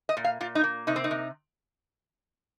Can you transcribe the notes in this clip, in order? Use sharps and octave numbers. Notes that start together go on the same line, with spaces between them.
D#5
A#2
F5
A#2 F4
D#4
A#3
C3 D#4
C4
D#4
C3